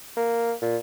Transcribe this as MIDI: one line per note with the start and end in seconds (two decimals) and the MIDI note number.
0.17 0.53 58
0.62 0.77 46